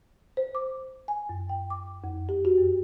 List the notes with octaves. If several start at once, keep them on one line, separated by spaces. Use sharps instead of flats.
C5
D6
G#5
F#2
G5
D6
F2
G4
F#4
F#2